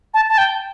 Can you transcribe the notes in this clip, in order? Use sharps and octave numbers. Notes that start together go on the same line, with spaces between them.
A5
A5
G5